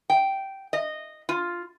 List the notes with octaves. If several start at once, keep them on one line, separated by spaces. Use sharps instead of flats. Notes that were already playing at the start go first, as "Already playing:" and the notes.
G5
D#5
F4